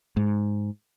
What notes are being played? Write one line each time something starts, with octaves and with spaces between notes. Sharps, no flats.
G#2